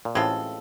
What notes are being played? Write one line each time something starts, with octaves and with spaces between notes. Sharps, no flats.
A#2
A1 A2 G#3 C4 F4 A4